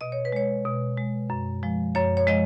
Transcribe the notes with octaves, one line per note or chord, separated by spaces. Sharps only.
B2 D#5
C#5
B4
G#3 C#5
B2
G#3
F#2
F3 G#3
F#2 C#5
C#5
F3 G#3 D#5